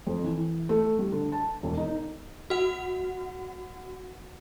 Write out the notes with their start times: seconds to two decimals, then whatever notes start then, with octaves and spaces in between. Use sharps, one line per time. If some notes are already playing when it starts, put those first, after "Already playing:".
0.07 F2
0.24 E3
0.69 A3
0.99 G3
1.12 D3
1.32 A5
1.63 E1
1.77 D#4
2.50 F#4 F#5